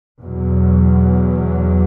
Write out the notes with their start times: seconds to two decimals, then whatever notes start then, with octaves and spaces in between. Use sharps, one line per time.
0.21 E2 B2 F#3